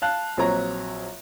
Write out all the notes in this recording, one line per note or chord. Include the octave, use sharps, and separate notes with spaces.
F5 A5 F#6
A#1 F#3 C4 C#5 A#5